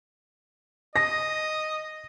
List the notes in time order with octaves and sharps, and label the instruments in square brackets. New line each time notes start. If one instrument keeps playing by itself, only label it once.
[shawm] D#5 [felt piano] A#6